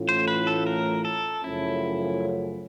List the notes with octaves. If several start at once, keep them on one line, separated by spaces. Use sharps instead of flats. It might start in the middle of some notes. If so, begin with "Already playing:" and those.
Already playing: A2 E3 A3 C#4 F4
C5
B4
A4
A#4
A4
F#2 C#3 F3 A3 C#4 E4